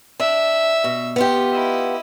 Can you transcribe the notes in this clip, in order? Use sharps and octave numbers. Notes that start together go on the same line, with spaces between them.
D4 E5
B2
B3 F4 G4
E4 D#5